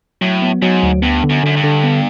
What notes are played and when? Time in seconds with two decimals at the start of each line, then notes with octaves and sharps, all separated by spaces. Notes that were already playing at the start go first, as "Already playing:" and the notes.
0.21 A2 F#3
0.42 B3
0.62 G#2 F#3
0.83 D2
1.02 G2 B3
1.24 D3
1.30 F#2
1.43 F#2 D3
1.56 G2
1.63 D3
1.83 B3